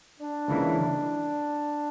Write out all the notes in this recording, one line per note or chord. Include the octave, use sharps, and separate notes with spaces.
D4
C#2 C#3 E3 A#3 E4